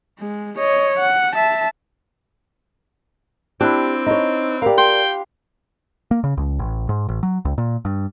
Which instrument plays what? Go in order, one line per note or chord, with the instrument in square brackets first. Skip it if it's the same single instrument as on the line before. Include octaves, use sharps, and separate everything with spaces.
[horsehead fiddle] G#3
C#5 D#5
F#5
E5 A5
[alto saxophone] C4 [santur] D4 E4 [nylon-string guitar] G4
[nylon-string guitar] D#4 C#5
[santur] G4 F5 [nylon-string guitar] A#4 D5
[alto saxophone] G5 [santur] C6
[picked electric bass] A#3
C#3
C#2
A1
G#2
A1
F#3
C#2
A#2
G2